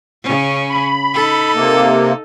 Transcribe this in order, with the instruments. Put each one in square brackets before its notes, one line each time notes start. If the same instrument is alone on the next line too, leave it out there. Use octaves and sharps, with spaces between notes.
[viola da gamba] C#3 C#4
[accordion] B5
[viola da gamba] D#4 A4
[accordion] C3 A#3